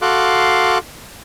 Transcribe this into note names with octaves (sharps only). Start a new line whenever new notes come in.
F#4 A4 F5 C6 D6 F#6